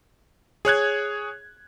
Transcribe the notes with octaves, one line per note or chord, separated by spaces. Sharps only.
G#4 C#5 F#6 G#6